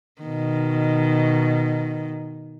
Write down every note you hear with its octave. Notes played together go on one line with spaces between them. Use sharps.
B2 D#3